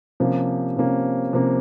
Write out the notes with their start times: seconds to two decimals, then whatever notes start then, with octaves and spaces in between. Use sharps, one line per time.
0.20 C3 F3 A#3 C#4
0.76 C3 F3 A#3 C#4
1.33 C3 F3 A#3 C#4